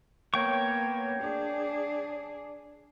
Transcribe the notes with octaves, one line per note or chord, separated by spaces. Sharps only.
A#3 B3 C#5 G5 C#6
D4 G#4